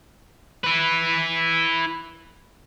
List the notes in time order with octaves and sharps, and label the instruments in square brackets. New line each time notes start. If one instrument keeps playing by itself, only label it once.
[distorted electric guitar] E4 B4